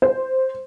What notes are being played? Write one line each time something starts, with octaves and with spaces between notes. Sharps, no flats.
C5